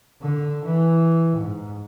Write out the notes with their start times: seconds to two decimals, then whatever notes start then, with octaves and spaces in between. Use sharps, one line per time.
0.21 D3
0.65 E3
1.37 G#2